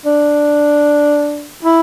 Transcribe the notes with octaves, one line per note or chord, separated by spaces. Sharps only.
D4
E4